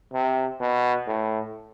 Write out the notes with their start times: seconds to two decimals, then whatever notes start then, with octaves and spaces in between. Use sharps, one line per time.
0.13 C3
0.60 B2
1.07 A2